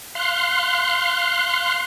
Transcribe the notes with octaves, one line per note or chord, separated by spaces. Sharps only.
F5 C6 F#6